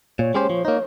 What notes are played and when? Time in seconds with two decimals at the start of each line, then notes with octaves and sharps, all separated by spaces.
0.19 A#2 C#5
0.34 G#3 C#4 G4 C5
0.50 F3
0.65 A#3 D#4